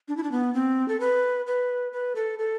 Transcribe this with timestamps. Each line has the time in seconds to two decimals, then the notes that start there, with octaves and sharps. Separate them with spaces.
0.08 D4
0.17 E4
0.23 D4
0.32 B3
0.54 C4
0.88 A4
1.00 B4
1.47 B4
1.92 B4
2.15 A4
2.39 A4